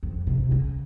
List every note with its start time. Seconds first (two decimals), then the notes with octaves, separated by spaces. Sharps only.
0.03 F2
0.27 C3
0.51 C#3